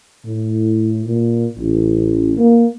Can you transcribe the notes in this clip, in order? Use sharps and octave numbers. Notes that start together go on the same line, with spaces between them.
A2
A#2
A1
A#3